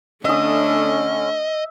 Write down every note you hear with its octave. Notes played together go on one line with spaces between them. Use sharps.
D3 A3 C#4 D4 D#5 E5 D#6